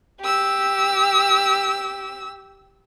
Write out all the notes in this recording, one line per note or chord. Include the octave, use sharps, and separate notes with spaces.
G4 E6